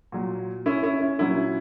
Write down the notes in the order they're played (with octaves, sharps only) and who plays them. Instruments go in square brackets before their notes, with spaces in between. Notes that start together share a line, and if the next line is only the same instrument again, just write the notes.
[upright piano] A#2 F#3
C#4 E4
C#4 E4
C#4
A#2 F#3 C#4 E4